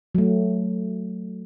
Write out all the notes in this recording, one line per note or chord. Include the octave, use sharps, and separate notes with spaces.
F#3 A3